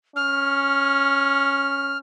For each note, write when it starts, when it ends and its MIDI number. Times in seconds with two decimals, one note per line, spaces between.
0.16 1.99 61
0.16 1.98 89